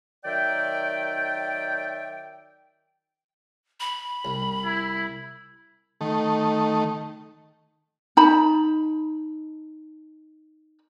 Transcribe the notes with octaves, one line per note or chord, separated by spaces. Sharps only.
D#3 F#3 D5 E5 G5
B5
C2
E4
D#3 A3
D#4 A5 B5